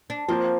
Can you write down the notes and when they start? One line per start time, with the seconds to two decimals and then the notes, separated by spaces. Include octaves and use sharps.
0.10 D4
0.28 F3 A#3 C4 F4 C5